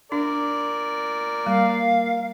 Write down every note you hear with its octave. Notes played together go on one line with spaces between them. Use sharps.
D4 A#4 D5
G3 A#3 F5